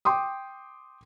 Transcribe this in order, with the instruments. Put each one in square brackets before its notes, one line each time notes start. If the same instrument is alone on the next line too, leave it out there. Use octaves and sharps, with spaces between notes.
[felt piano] G5 C6 D6 D#6